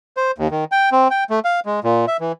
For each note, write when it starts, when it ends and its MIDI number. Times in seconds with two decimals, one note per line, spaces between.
0.17 0.31 72
0.38 0.48 39
0.51 0.64 51
0.72 0.89 79
0.92 1.08 60
1.11 1.24 79
1.30 1.40 57
1.45 1.60 77
1.66 1.80 56
1.84 2.06 46
2.08 2.17 76
2.20 2.32 52